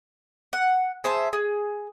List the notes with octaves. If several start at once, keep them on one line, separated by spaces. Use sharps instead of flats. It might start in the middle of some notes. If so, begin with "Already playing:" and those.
F#5
G#4 C5 E5 A5
G#4